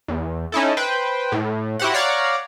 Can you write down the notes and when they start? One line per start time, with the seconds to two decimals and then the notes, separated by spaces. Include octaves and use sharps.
0.08 E2
0.52 C#4 D#4 E4 A4
0.77 B4 C5 G5
1.32 A2
1.79 E4 F#4 G4 C5 F#5
1.94 C#5 D5 F5 F#5 A#5